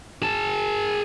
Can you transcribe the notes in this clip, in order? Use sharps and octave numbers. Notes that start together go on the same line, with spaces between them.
G#4 A5